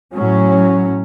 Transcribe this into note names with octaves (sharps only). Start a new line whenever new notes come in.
A2 F#3 C#4